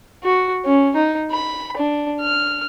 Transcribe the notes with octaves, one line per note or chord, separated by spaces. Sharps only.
F#4
C#4
D#4
B5
D4
F6